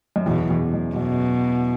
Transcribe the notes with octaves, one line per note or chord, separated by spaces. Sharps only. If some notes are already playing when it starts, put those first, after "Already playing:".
F#2
E2 B2
E2
F#2
F#2 B2